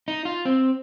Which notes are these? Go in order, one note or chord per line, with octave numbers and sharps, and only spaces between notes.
D#4
F4
C4